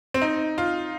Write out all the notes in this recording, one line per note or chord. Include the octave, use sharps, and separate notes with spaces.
C4
D#4
F4